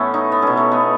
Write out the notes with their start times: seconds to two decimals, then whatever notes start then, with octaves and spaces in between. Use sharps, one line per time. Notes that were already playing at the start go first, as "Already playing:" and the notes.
Already playing: A2 E3 A3 B3 C#4
0.14 D#4
0.32 B3
0.42 B2 A3 C#4
0.57 A3
0.72 B3